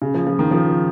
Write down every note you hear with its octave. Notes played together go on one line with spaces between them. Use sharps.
C#3
F3
F3
D#3
F3